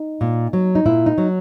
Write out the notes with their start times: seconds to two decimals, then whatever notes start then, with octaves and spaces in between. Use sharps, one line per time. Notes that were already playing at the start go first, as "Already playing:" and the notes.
Already playing: D#4
0.21 A#2
0.53 F#3
0.75 D#4
0.86 A#2 E4
1.06 D#4
1.18 F#3